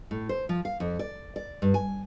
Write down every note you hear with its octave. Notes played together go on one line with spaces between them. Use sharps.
A2
C5
F3
F5
F2
D5
D5
G2
G#5